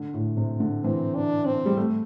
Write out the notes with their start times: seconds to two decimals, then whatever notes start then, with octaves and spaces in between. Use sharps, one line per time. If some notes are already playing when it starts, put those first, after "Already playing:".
Already playing: D3
0.14 A2
0.37 C3
0.60 D3
0.84 E3 C4
1.15 D4
1.46 C4
1.66 G3
1.77 A3